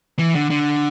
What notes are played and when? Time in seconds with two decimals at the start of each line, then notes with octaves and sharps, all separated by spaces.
0.19 E3
0.35 D3
0.50 D3